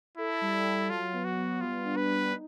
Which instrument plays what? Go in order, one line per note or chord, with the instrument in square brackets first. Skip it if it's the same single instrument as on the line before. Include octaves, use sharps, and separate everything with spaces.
[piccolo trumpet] E4 [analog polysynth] A4
[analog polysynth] G3
A4
[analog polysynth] F#3 [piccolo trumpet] F4
[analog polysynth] B3
[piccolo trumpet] F#4
[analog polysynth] B3
[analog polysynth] G3 [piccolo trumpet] F4
[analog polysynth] D4
[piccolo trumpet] B4
[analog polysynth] G3
D#4